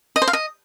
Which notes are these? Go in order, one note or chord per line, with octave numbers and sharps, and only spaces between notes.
D#5
C5
F5
D#5